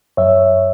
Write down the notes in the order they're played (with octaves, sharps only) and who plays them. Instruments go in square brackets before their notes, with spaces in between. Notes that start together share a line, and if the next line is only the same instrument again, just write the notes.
[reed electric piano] F#2 C#5 E5